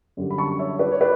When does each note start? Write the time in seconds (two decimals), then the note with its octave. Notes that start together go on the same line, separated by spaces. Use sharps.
0.17 F#2 D3 G3
0.31 B5
0.38 A5 C#6
0.59 C#5 E5
0.79 B4 D5
0.92 C#5
1.01 B4 D5